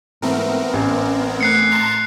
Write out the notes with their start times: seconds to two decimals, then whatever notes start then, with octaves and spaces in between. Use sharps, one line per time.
0.22 G#2 E3 A3 B3 C4 A#4
0.73 A1 C#4
1.41 A3 F#6 C7 C#7
1.71 A5 A#5 C6